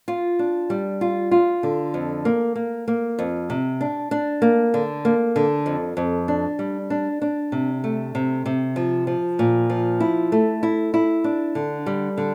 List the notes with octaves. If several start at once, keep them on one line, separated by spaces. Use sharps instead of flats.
F4
D4
G3
F4
F4
D3
F2
A#3
A#3
A#3
F2
C3
D4
D4
A#3
D3
A#3
D3
F2
F2
D4
G3
D4
D4
C3
A3
C3
C3
F3
F3
A#2
F3
E4
A3
E4
E4
D4
D3
G3
D3